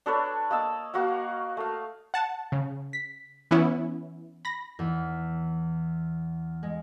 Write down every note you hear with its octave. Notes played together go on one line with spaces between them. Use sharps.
D4 A4 B4 C#5
A#3 D#5 A5 E6
A#3 F#4 F5 F#5
A3 F5
F#5 A5
C#3
B6
E3 B3 C#4 E4
B5 A#6
E2
G#3